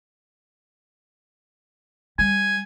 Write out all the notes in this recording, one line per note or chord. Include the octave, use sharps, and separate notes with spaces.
G3 G#5